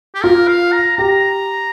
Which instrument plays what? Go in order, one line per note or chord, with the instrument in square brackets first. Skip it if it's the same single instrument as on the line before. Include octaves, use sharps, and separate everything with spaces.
[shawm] G4
[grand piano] F4 [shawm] A#4
[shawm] F5
A#5
[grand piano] G4 [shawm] A#5